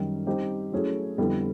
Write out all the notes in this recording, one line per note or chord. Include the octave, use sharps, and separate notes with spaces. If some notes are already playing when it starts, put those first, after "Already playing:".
Already playing: F#2 D#3 G3
G3 C4 D#4 G4
F#3 A3 C#4 E4 G#4
F2 D3 G3 B3 E4